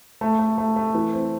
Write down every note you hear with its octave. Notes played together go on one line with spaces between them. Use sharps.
A3
A3
A3
A3
E3
C4